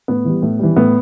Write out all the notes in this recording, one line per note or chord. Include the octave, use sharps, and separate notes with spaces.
A2 B3
E3 G3
A2
E3 G3
A2 B3